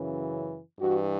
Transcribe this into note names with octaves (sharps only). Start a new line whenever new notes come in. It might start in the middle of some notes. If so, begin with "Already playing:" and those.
Already playing: F#2 C#3 E3
G2 E3 F#4